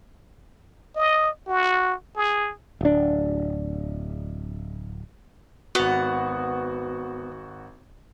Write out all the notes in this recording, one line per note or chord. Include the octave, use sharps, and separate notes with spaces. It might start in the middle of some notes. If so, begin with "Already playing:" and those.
D#5
F#4
G#4
D1 D4
G#1 B3 F#4 F#5